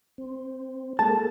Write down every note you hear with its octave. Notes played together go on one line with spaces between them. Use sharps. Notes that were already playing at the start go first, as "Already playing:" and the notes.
C4
G#3 A#3 A4 A5